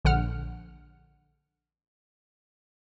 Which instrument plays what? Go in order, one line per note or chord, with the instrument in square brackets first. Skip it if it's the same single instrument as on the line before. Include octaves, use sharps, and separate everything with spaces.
[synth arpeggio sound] A#1 D3 F#5 F6